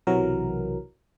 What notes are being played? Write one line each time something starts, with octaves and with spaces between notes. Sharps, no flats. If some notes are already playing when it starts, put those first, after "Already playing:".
B1 C3 E3 F#3 A#4